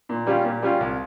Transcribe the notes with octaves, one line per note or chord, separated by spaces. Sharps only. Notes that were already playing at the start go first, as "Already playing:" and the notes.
A#2
G3 C#4 F4
A#2
G3 C#4 F4
C2